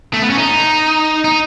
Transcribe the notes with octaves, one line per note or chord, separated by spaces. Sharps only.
A3
B3
C#4
D#4
D#4